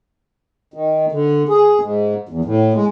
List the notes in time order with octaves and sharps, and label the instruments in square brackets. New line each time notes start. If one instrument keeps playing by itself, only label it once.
[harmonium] D#3
D3
G#4
G#2
E2
A2
G#3